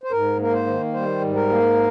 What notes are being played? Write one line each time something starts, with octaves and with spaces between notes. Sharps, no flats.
C5
G#2 A#4
A#3 A#4
C5
D#3
G3 C5
G#2
A#4
A#3